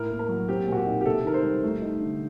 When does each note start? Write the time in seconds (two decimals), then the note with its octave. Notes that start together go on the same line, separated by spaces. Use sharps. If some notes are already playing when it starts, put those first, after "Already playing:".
Already playing: A2 A#4
0.11 A#3
0.19 A#4
0.29 F#3
0.49 C4 G4
0.68 A#2 F#4
0.77 G4
0.86 D#4
1.01 G4
1.05 C3 A4
1.24 D#3 A#4
1.34 C5
1.44 G3
1.63 A3
1.82 D#4
2.01 D3